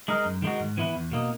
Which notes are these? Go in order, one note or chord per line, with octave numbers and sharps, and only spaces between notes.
G#3 D#4 A#4
F#2
D#3 G#3 D#4 F#4
G#2
E3 B3 E4 B4
E2
B2 A#3 D#4